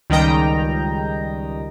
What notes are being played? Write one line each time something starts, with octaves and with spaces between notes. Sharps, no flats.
C#2 D#3 G3 D#5 G5 A#5